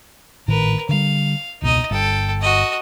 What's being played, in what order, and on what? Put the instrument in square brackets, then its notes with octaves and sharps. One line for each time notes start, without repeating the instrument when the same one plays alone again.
[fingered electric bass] G#1 A2 D#3 [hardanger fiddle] A#4 B4
[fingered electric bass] D3 G3 [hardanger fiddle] F5
[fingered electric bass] E1 C#2 B2 [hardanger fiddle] D#4 D#5
[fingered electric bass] G1 [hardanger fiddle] A4 G5
[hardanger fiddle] F#4 D#5